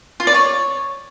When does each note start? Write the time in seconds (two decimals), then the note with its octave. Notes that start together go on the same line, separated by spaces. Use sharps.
0.20 F4
0.27 D5
0.34 C#5